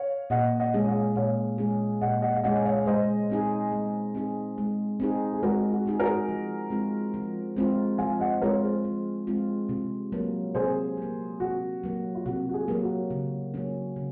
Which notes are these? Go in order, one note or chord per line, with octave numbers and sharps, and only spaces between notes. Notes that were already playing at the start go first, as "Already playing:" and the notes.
Already playing: C#5 F5
A#2 D#5 F#5
D#5 F#5
G#3 C#4 G#4
C#5 F5
A#2 C#5 F5
G#3 C#4 G#4
A#2 D#5 F#5
D#5 F#5
F5
G#3 C#4 G#4 D#5 F#5
C#5 F5
G#3 C5 D#5
C4 D#4 G#4
G#3
C4 D#4 G#4
G#3
C4 D#4 G#4
G#4
G#3 F#4 A#4
F#4
C4 D#4 G#4
F#4 A#4
F3
G#3 C4 F4
F3
G#3 C4 F4
F3 F5 G#5
D#5 F#5
G#3 C4 F4 A#4 C#5
G#4 C5
F3
G#3 C4 F4
C3
F#3 A#3
C3 G#4 C5
F#3 A#3
C3 F#4
F#3 A#3
F4
C3 F#4
F#4
F4 G#4
F#3 A#3
F#4
C#3
F#3 A#3 C#4
C#3